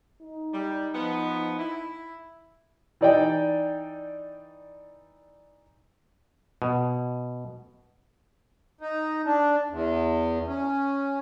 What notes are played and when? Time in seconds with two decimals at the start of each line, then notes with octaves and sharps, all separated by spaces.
0.21 D#4
0.53 G3
0.94 F3 B3
1.59 E4
3.01 E3 D#4 D5 D#5 G5
6.62 B2
8.81 D#4
9.25 D4
9.71 E2
10.48 C#4